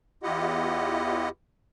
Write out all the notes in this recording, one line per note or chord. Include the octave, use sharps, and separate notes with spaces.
E2 E4 F4 G4 D#5 F#5